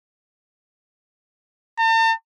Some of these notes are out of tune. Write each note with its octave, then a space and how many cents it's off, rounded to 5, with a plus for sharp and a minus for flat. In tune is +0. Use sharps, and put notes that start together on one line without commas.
A5 +45